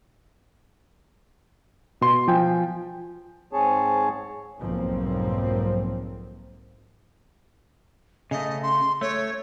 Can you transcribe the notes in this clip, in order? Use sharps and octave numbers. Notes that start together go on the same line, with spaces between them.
B2 C6
F3 G5 G#5
G#2 C4 G#4 C#5 A5
B1 F2 G#2 F3 A#3 C4
C#3 A3 D#5
C6
A3 C#5